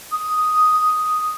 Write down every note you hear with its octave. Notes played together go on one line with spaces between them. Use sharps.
D#6